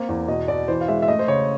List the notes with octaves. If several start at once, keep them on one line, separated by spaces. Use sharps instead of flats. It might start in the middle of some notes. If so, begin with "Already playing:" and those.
Already playing: A#3 C4
E2
B2 D#5
B2 D5
E3 C5
F5
G#3 E5
E5
A3 D#5
C5
C#3 C#5